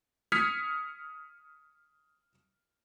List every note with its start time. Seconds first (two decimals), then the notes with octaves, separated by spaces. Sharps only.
0.32 D#6 F6 G#6 B6 C#7